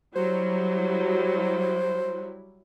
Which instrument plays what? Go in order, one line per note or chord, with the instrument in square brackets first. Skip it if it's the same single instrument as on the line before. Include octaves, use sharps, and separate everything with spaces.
[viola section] F#3 G3 E4 [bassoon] C5